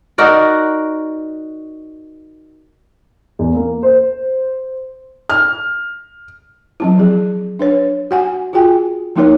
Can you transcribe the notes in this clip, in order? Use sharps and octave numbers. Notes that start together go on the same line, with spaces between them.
D#4 F#4 A#4 D5
E2
A#3
C5
F6
F#3 C4 E4
F3 G#4
D4 B4 C#5
F#4 F#5 G#5
F4 F#4 G#4 G5 G#5
F3 A#3 D#4 E4 A#4 C#5